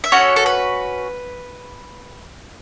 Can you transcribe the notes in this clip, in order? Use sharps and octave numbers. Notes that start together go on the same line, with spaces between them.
E5
C#4 F#4 A4 C#5
A4
B4